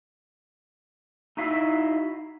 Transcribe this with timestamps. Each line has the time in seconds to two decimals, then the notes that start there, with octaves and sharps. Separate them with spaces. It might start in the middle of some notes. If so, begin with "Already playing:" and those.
1.37 D#4 E4 F#4 E5 F5